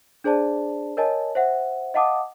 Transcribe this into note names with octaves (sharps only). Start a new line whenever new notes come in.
D4 G#4 C5 D5 A5
A#4 C#5 D#5 G#5 A5
C5 E5 F#5
D#5 F5 F#5 A5 D6 D#6